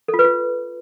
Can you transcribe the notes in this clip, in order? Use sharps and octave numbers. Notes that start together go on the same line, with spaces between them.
A4
F4
B4
F4